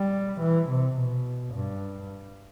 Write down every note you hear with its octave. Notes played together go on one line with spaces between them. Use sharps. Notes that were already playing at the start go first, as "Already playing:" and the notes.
Already playing: G3
E3
C3
B2
G2